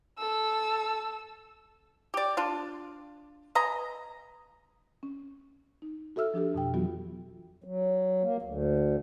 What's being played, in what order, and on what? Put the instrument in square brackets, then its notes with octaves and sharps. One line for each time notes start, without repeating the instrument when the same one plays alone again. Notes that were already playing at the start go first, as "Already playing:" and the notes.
[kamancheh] A4 E6
[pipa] G4 D5
D4 F4
B4 D#5 G#5 A#5
[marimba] C#4
D#4
F#4 A4 E5 E6 F6
F3 D4 G4 A4
F2 B2 G5
E3 F#3 B3 F4 F#4
[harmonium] F#3
A#3
D2